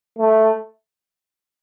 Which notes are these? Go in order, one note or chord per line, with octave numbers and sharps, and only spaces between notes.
A3